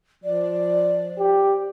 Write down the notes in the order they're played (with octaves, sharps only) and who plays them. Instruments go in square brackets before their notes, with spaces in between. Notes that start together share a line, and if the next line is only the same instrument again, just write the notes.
[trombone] F3 [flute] D5
[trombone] G4